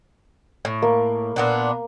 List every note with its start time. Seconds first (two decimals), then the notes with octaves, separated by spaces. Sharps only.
0.65 A2
0.82 A#3
1.36 A#2 B3 D4